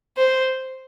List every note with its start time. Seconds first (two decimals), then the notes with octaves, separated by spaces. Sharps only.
0.17 C5